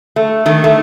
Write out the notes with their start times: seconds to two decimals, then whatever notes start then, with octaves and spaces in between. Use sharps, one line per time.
0.16 A3
0.46 D#3 A3
0.64 A3